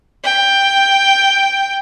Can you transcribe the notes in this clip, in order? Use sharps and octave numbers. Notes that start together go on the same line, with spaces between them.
G5